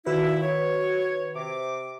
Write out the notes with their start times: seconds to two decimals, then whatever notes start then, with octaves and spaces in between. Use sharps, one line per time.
0.06 A#2 D#3 E4 F#4 B4
0.42 C#5
1.35 C3 D6